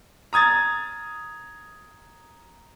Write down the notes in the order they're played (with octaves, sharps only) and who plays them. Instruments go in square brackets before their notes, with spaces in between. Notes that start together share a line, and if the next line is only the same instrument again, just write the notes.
[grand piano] A#5 D#6 G#6 A6